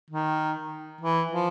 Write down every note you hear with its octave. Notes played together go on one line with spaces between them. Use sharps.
D#3
E3
F3